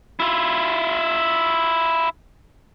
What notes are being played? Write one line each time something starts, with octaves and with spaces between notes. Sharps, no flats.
E4 F4